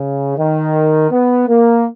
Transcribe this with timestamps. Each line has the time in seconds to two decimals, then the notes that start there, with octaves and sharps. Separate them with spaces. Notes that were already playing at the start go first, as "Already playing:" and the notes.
Already playing: C#3
0.37 D#3
1.11 B3
1.47 A#3